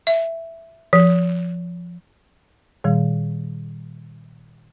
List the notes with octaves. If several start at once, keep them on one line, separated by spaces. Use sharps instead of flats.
E5
F3
A#2 D#3 G3